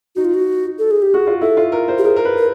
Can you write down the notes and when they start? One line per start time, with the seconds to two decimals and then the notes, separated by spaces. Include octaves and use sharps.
0.16 D#4 F#4
0.25 F4
0.34 F#4
0.79 A4
0.91 G#4
1.02 G4
1.14 F#4 G#4
1.27 F4
1.41 E4 A4
1.57 F4
1.72 A#4
1.88 C5
1.98 G4
2.04 G#4 A#4
2.16 A#4
2.25 B4
2.38 A#4